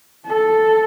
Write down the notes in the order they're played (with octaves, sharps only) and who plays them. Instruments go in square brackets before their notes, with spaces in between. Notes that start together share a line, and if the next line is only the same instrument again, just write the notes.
[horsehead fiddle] A4